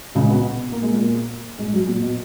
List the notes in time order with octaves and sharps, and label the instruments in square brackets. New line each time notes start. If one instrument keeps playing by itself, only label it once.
[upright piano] C#2 C#3
B2 B3
A#3
G#3
A#2 A#3
G#2 G#3
F#2 F#3
A#2
B2